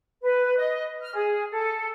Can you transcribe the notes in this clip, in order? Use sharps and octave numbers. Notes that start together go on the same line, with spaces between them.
B4
D#5
F6
G#4
A4